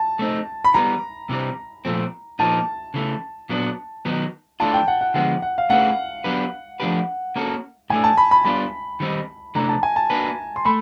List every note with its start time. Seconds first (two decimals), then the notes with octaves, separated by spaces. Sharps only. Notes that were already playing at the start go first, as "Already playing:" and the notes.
Already playing: A5
0.19 A3 C4 D#4
0.65 B5
0.74 E3 G3 B3 A#5
1.29 C3 E3 G3 C4
1.85 A#2 F3 A3 C4
2.39 A#2 F3 A#3 D#4 A5
2.94 C#3 E3 A3
3.49 A#2 F#3 B3 D4
4.05 D#3 F#3 B3 D#4
4.60 E3 A3 D4 F4 A5
4.74 G5
4.88 F#5
5.01 F#5
5.14 D3 F3 G#3 B3 F#5
5.42 F#5
5.58 F5
5.70 A3 C#4 E4 G#4 B4 F#5
6.24 F#3 B3 D4 G4 B4
6.80 F3 A3 D4 G4 B4
7.36 A#3 C#4 F#4 A4
7.90 A2 E3 A3 D4 G#5
8.04 A5
8.17 B5
8.31 B5
8.45 G3 B3 D4 F4 B5
9.00 D#3 G3 C4 D#4
9.55 C3 E3 A3 D4 A#5
9.69 A5
9.83 G#5
9.96 A5
10.10 A#3 D4 F#4 B4
10.56 C6
10.65 A3 B5